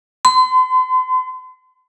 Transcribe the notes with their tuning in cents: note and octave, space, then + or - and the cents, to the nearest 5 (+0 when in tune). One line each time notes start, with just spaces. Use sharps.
C6 -40